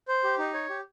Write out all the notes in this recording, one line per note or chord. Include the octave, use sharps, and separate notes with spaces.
C5
G4
D#4
C#5
G4